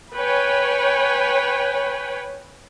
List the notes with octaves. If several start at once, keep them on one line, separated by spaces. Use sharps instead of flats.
B4 C#5 G5 G#5